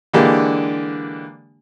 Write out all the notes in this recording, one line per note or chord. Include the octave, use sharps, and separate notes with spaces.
D3 E3 G#3 A#3 D4 G4